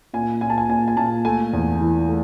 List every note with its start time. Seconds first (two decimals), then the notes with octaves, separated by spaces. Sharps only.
0.13 A#2 G#5
0.41 A#2 G#5
0.50 A5
0.58 G#5
0.69 A#2 G#5
0.88 G#5
0.97 A#2 A5
1.25 A3 G#5
1.53 E2
1.81 E3
2.09 A3